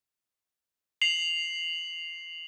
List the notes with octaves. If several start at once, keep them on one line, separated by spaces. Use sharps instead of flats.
C7 F7 F#7